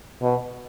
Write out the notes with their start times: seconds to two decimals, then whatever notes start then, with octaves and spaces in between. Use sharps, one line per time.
0.22 B2